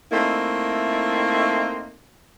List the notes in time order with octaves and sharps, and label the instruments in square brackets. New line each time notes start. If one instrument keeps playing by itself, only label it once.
[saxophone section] A3 A#3 C4 D#4 E4